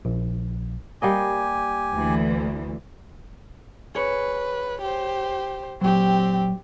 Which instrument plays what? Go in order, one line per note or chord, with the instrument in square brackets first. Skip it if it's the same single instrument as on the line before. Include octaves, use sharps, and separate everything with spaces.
[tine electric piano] A#1
[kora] G3 A#3 D#5 [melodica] G4 G#5
[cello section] D2 E3
[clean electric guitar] G#4 C#5 [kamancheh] B4
[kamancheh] G4 C5
[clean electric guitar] A#2 F#3 [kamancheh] C4 G4